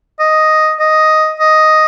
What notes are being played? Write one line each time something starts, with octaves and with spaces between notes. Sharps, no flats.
D#5
D#5
D#5